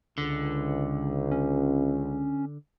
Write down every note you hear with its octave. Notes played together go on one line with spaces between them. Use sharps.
C#2 D3
C#4